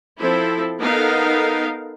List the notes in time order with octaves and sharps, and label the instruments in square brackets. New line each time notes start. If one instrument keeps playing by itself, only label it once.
[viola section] F3 C4 E4 A4
B3 D#4 A4 A#4 F5